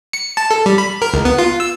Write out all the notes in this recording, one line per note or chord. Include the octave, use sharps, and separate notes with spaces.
C#7
A5
A4
G3
B5
A#4
C#2
B3
F4
E6